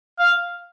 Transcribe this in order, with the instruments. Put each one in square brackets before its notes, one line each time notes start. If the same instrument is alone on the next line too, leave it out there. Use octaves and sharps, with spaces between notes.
[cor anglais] F5